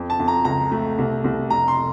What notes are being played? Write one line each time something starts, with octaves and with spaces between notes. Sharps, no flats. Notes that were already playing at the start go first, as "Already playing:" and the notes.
Already playing: F2
A5
F2
A#5
C#2 A#5
A3
C2
C2
F1 A#5
C6